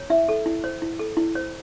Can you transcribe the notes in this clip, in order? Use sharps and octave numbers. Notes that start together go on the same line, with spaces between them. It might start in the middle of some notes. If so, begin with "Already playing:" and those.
Already playing: C#5
E4 E5
A4
E4
C5
E4
A4
E4
C5